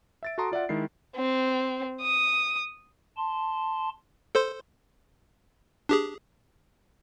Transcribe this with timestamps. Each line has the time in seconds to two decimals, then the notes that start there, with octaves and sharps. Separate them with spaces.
0.23 E5 A6 D7
0.38 F#4 A4 A5 A#5 C6 D#6
0.52 F4 D5 E5 F#5
0.69 D#3 G#3 E4 C7
1.16 C4
2.02 D#6
3.17 A5 C6
4.35 A4 C5 C6
5.89 D4 G4 G#4